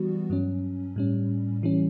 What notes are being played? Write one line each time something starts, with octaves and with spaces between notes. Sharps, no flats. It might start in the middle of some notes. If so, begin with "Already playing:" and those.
Already playing: E3 G3 B3 F#4
G2 F#3 C#4
A2 G3 C#4
E3 G3 C#4